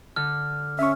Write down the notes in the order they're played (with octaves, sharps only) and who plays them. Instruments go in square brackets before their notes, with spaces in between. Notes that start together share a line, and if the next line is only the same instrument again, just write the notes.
[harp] D3 [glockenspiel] F6
[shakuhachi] C#4 [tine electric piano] E5 C#6